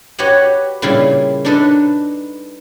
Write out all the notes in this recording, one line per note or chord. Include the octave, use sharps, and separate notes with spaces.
F#4 G4 B4 C#5 D#5 F#5
A#2 C#3 G3 E4 F4
D4 D#4 A4 B4 D#5